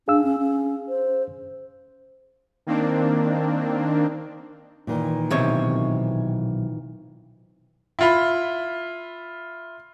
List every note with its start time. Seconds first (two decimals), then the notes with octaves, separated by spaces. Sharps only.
0.08 D4 G#4 F5 E6
0.24 C#4
0.39 C#4
0.89 C5
2.67 D#3 A#3 C4 D4
4.87 A#2 D#3 E3
5.31 B1 C3 C#5
7.99 E4 F4 B5